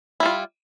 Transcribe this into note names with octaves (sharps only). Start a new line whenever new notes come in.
G3 E4 F4